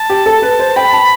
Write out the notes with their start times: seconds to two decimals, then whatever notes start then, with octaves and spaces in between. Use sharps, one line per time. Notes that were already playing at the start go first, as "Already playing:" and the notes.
Already playing: A5
0.10 G4
0.26 A4
0.42 B4
0.59 C5
0.76 G5 B5
0.93 A5